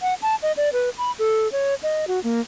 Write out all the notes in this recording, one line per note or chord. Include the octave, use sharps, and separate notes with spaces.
F#5
A5
D#5
D5
B4
B5
A4
C#5
D#5
F#4
A#3